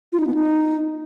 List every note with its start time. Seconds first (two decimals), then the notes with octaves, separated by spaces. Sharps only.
0.13 F4
0.20 D#4
0.27 B3
0.34 D#4